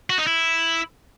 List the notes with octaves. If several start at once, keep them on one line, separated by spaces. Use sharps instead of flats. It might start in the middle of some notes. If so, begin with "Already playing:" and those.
F#4
D#4
E4